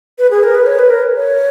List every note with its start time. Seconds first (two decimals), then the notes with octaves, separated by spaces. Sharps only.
0.19 B4
0.31 G#4
0.43 A#4
0.55 B4
0.66 C#5
0.79 B4
0.90 A#4
1.15 C#5